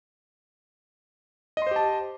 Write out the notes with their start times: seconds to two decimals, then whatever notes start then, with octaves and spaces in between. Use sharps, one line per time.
1.57 D#5
1.62 C6
1.67 C5
1.71 G4
1.76 A5